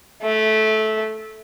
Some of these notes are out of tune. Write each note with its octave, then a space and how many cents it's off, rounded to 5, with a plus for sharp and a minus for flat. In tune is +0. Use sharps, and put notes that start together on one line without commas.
A3 -15